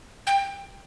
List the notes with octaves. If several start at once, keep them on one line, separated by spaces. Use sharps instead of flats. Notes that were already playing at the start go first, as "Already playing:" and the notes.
G5